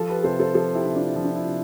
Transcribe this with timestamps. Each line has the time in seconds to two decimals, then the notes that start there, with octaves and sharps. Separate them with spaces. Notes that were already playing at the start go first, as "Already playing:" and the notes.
Already playing: F3 F4 A4
0.09 G4 B4
0.24 C3 A4 C5
0.40 A4 C5
0.55 F3 F4 A4
0.75 E4 G4
0.86 C3
0.95 D4 F4
1.16 F3
1.24 D4
1.36 E4
1.47 C3